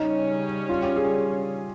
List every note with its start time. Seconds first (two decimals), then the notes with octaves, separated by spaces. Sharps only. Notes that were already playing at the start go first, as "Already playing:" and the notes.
Already playing: C#3 G3 C#4 D#4
0.69 F4
0.83 G4
0.96 G#4